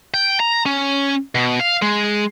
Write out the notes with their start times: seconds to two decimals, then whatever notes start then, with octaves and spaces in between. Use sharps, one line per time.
0.14 G5
0.40 A#5
0.66 C#4
1.35 B2
1.60 F5
1.82 G#3